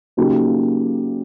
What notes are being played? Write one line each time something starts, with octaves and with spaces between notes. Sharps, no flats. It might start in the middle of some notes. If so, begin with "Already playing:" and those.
C#3 F#3 A#3 D#4 G4